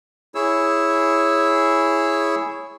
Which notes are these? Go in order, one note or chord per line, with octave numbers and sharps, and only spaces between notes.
E4 G#4 C#5 E6